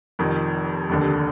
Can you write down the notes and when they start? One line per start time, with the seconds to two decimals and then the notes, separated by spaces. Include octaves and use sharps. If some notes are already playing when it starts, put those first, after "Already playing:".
0.19 F1 F2 D#3
0.89 F1 D#2 D3